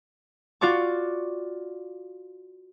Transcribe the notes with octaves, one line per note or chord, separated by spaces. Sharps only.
F4 F#4 D5 C#6 D6